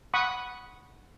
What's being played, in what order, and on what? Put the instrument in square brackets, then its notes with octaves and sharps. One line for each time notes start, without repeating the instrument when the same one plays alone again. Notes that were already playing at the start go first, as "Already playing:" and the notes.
[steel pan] F#5 B5 C#6 D#6